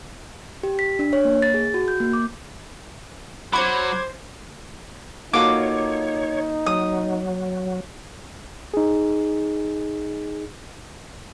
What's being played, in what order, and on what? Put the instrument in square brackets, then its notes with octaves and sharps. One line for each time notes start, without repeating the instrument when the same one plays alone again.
[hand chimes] G4
B6
D4
C#5
A#3
A6
G#4
F#4
G6
A#3
D6
[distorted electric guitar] F#3 [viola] C5 [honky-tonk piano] B5 [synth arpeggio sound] D6 G#6
[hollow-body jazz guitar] A#3 F#4 [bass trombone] D#4 [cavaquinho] F4 A4 D6 [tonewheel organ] C#5
[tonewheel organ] F#3 [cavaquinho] D#6
[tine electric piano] D#4 G#4